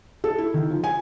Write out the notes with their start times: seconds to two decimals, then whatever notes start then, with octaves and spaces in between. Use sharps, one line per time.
0.24 A4
0.38 E4
0.54 D#3
0.70 F3
0.84 G#5